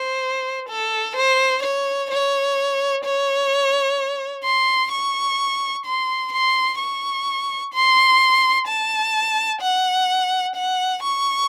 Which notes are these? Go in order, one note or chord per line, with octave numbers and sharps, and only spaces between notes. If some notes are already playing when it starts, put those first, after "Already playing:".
Already playing: C5
A4
C5
C#5
C#5
C#5
C6
C#6
C6
C6
C#6
C6
A5
F#5
F#5
C#6